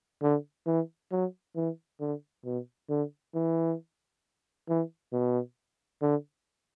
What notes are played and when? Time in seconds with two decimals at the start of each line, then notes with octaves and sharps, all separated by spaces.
0.22 D3
0.67 E3
1.11 F#3
1.56 E3
2.00 D3
2.45 B2
2.90 D3
3.35 E3
4.68 E3
5.13 B2
6.02 D3